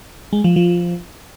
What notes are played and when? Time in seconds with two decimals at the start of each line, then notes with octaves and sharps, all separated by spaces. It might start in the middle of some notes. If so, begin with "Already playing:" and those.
0.33 G#3
0.44 F3
0.56 F3